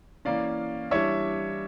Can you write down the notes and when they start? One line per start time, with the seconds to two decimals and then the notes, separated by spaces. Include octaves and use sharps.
0.25 E3 A#3 C#4 D5 F5
0.91 E3 G3 D4 C#5 E5